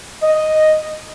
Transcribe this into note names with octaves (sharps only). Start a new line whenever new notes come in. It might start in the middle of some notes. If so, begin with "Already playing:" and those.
D#5